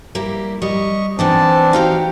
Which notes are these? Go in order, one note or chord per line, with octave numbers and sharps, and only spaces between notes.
G3 A#3 E4
G3 D#5 C#6
E3 B3 C4 D4 D#4 D5 A5
D#4 F#4 G4 F5